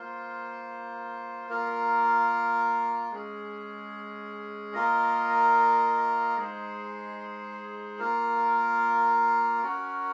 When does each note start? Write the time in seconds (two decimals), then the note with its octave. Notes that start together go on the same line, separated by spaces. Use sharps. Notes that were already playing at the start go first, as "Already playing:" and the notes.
Already playing: A#3 F4 C5
1.49 A#3 F4 A#4
3.11 G#3 C#4 G#4
4.74 A#3 F4 A#4 D#5
6.37 G#3 D#4 G#4 C5
7.99 A#3 F4 A#4
9.63 C#4 F#4 A#4